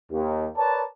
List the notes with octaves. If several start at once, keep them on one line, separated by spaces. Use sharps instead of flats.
D#2
A#4 B4 C#5 D5 A5